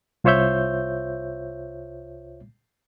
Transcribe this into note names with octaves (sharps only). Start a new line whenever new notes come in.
C2 F4 C5 C#5 E5 G6